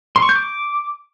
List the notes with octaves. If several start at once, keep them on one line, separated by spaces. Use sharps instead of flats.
C6
C#6
G6
D6